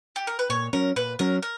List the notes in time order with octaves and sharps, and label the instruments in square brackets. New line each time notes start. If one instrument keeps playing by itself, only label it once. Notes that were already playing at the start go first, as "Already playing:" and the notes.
[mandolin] G4
A#4
B4
[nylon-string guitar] A#2 [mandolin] C#5
[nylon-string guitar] F#3 C#4 [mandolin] A#4
[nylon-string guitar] A#2 [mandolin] B4
[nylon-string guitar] F#3 C#4 [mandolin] A#4
[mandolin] A#4